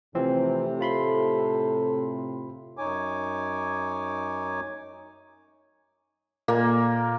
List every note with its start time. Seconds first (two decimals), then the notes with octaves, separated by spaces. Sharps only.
0.15 A2 C3 E3 F3 C4
0.80 F4 A4 B5 C6
2.77 F#2 D#4 C#5 G#5 D6
6.48 A#2 A#3